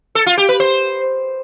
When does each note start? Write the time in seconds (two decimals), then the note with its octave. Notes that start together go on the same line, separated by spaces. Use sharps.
0.15 A4
0.26 F4
0.38 G4
0.49 B4
0.60 C5